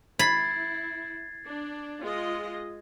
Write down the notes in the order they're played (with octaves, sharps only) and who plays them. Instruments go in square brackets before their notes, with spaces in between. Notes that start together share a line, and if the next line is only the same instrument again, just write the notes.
[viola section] E4 [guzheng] B5 [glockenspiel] G#6 A6 C7
[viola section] D4
G#3 F4 D#5